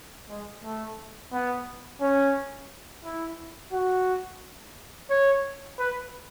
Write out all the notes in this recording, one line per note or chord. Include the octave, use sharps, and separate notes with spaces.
G#3
A3
B3
C#4
E4
F#4
C#5
B4